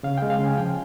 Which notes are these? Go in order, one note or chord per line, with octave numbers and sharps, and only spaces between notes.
C#3 F5
G#3 G5
F5
C#3
G#5
F3 G5